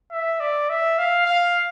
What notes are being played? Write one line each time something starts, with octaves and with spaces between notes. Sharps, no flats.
E5
D5
E5
F5
F5